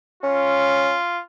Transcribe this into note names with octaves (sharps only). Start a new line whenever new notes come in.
C#4 F4